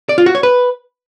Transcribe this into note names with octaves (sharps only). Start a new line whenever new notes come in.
D5
F4
F#4
C#5
B4